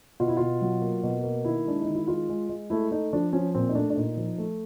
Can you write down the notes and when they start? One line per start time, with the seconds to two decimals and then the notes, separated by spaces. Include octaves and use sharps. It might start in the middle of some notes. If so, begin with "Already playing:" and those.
0.20 B2 F4
0.28 E4
0.37 B2 F4
0.62 F#3
0.82 A#3
1.03 B2
1.24 A#3
1.45 D#3 E4
1.67 G#3 D4
1.82 D#4
1.88 D#3
1.95 E4
2.08 G#3 F4
2.29 G#3
2.49 G#3
2.70 A3 E4
2.91 A3 D#4
3.13 F3 D4
3.33 F3 C#4
3.54 A#2 C4
3.69 D#4
3.75 A3 D4
3.90 D4
3.96 A#2 D#4
4.17 F3
4.38 A3